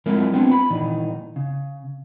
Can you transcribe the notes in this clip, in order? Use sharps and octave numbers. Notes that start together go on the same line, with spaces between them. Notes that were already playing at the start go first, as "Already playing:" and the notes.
F#3 G#3 C4 E4 F4 A#4
B3 C4 D4 F4
B5
A#2 D#3 E3 D#4
C#3